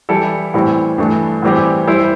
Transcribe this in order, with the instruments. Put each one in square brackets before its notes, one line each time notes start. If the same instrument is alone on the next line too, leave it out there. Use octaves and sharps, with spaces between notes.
[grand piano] E3 G3 E4 A4
A2 E3 G3 C4
G2 E3 A3
A2 E3 G3 C4 G4
G3 E4 C5